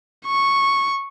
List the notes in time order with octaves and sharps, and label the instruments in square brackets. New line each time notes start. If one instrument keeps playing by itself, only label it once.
[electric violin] C#6